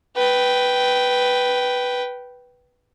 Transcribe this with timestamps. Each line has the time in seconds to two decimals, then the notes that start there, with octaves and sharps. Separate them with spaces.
0.16 B4 G5